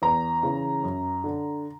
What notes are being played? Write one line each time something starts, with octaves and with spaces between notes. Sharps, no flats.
E2 A#5
C#3 E3
F#2
D3